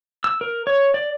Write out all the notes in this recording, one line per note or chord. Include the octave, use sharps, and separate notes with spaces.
E6
A#4
C#5
D5